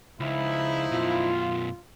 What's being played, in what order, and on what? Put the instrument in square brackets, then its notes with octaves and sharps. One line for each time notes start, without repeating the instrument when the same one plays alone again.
[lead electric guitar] C#2 [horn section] F3 D#4 E4
[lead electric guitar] F#2 B2 [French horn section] F4